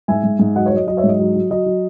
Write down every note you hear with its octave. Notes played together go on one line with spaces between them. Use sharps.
G#2 E5 G#5
G#2
G#2
F#3 D#5 F#5
F#3 C#5
D#5
F#3 D#5
C#5 E5
G#2 D#5
F#3
F#3
F#3 D#5
F#3